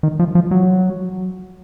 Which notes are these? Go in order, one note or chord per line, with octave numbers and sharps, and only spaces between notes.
D#3
F3
F3
F#3